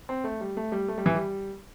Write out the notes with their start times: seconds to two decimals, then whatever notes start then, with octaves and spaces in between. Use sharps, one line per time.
0.09 C4
0.24 A3
0.41 G3
0.57 A3
0.72 G3
0.88 A3
0.98 G3
1.06 E3
1.15 G3